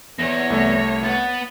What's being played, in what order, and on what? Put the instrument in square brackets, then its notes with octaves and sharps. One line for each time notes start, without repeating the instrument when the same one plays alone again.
[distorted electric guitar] E2 [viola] C#5 [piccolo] A#6
[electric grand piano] C2 A3
[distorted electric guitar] B3 F#5 [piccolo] A6